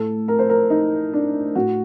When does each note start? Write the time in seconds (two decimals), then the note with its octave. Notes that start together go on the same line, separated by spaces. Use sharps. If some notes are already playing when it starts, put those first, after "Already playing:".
Already playing: A2 A4
0.28 A#4
0.39 C5
0.50 A#4
0.70 D#4
1.13 D4
1.55 A2 F#4